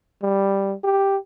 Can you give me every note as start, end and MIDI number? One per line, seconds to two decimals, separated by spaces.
0.23 0.75 55
0.84 1.17 67